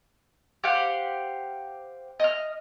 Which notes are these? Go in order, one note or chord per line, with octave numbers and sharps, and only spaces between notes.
G4 C5 F5 F#5
D#5 F6